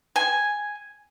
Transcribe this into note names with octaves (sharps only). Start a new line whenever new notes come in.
G#5